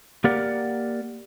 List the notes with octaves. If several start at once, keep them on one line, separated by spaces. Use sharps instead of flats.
A#3 G4 A#4 D5 F#5